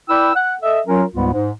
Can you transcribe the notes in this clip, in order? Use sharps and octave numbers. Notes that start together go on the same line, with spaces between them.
E4 B4 D5 G5 E6
F#5
A4 D#5 E5
F#3 C#4 F4 A#4
C#2 G#2 G3 B3 F4
G#2